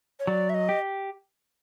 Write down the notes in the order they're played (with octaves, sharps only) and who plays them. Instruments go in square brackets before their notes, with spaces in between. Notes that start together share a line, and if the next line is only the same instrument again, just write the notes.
[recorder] C#5
[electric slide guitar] F#3 [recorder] D5
[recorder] E5
D#5
[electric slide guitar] G4